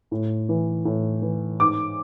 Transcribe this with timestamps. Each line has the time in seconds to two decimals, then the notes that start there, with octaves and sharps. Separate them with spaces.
0.11 A2
0.49 E3
0.85 A2
1.22 E3
1.60 G#2 D6